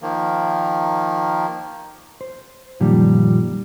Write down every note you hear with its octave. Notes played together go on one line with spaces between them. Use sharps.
D#3 F3 A#3
C5
F#2 A#2 D#3 F3 G3